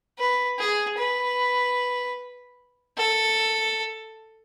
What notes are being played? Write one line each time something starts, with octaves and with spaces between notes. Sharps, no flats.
B4
G#4
B4
A4